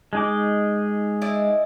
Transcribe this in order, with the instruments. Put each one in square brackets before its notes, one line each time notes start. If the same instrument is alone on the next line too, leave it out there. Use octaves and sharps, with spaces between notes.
[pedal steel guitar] G#3 D#4 D6
[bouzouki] E4 D5 D#5